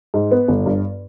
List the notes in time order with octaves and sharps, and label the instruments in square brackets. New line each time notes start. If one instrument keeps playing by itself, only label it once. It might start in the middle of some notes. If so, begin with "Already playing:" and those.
[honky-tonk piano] G#2
B3
G1
G2